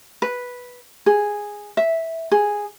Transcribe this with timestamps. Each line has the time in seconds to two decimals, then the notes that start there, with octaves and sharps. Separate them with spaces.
0.22 B4
1.06 G#4
1.77 E5
2.32 G#4